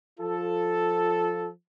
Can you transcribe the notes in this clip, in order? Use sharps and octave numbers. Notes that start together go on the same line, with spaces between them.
F3 F4 A4